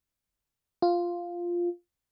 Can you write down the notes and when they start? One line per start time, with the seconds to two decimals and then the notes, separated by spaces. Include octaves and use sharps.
0.82 F4